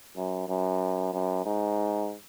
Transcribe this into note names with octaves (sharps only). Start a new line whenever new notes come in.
F#2
F#2
F#2
G#2